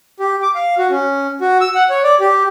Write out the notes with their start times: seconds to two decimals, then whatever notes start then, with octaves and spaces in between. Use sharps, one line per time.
0.20 G4
0.42 D6
0.55 F5
0.78 F#4
0.90 C#4
1.41 F#4
1.61 E6
1.75 F#5
1.90 C#5
2.04 D5
2.20 G4